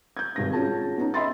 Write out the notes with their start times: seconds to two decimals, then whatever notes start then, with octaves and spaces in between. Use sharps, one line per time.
0.17 G6 G#6
0.36 G#1 G2 A#6
0.53 C#4 F4 F#4 G#4 A5
0.98 B3 C#4 D#4
1.14 D#5 E5 B5 C6 A6